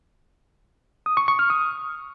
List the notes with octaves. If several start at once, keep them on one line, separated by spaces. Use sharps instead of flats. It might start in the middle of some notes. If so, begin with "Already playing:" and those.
D#6
C#6
C#6
F6
D#6